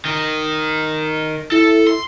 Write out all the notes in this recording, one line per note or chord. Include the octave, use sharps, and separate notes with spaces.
D#3
E4 A4
C6